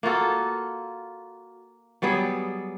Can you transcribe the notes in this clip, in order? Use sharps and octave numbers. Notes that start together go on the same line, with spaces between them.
A#3 F4 F#4 A4
F#3 G3 B3 G#4